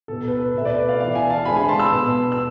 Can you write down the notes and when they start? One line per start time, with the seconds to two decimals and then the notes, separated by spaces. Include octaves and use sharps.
0.08 B2 B3 A4
0.28 B4
0.32 A4
0.54 B2 A3 C4 E5
0.65 B4 D5
0.89 D5 F5
1.00 E3 B3 D5 F5
1.15 E5 G#5
1.30 F5 A5
1.45 D3 G#3 C4 G#5 B5
1.57 G#5 B5
1.69 A5 C6
1.80 C6 E6
1.91 B2 B3
2.32 E6